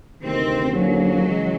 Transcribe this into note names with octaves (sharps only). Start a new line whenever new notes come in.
D2 C3 D#3 C4
D#2 D3 F3 F#3 A#3 C#4
C#3 E3 G#3